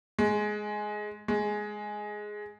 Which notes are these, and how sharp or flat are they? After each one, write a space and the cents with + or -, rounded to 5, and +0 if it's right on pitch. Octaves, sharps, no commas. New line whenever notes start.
G#3 +10
G#3 +5